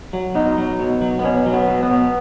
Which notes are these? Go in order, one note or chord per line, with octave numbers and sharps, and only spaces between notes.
F#3
B2 D#4
F#3
B2
F#3
B3
B2 C#4
F#3
B3
B2
B3
B2